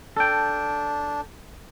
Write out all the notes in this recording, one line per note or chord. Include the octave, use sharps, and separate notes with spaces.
D4 A4 G5